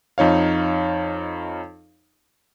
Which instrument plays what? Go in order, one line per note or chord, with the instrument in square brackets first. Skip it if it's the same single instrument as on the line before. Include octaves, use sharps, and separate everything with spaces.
[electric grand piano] F2 D#4 C#5 F5